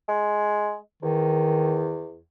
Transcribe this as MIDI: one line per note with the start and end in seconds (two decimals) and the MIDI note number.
0.08 0.77 56
1.02 2.20 40
1.02 2.09 51